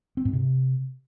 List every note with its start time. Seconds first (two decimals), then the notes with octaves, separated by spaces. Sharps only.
0.17 C4
0.25 G#2
0.33 C3